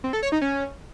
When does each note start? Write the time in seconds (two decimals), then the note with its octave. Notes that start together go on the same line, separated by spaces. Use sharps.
0.04 C4
0.13 A4
0.23 C#5
0.32 D#4
0.41 C#4